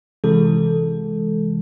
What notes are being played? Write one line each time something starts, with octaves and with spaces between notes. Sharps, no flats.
C3 E3 G#3 A4